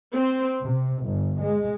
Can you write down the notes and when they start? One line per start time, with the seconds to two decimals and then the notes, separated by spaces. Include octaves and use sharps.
0.16 C4
0.63 C3
1.05 G1
1.41 G#3